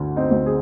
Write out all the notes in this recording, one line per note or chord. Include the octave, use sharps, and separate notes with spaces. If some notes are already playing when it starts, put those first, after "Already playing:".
Already playing: D2 D3
C4 D#4
D2
G#4